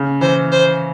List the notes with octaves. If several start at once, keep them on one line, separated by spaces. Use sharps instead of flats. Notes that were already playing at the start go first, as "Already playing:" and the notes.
Already playing: C#3
E3 C5
C5